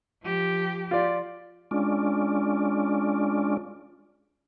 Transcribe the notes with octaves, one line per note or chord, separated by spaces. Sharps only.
F3 G4
F4 D5
G#3 C#4 D4 F4 D5